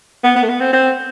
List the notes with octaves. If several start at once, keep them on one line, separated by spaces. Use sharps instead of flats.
B3
B3
A3
B3
C4
C4